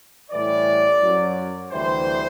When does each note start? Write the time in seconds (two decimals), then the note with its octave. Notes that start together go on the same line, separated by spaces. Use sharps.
0.31 A2 E3 G3 D5
1.01 F#2 F#3
1.71 D2 C3 E3 G3 C5